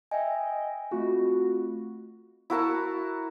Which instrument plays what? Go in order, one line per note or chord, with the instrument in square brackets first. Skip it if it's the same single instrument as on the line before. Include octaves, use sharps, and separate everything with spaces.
[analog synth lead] D#5 [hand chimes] E5 G5 G#5
[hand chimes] A3 C4 F4 [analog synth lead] F#4
[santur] E4 F#4 A#4 A5